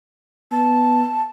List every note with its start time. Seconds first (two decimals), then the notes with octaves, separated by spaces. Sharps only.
0.52 B3 A5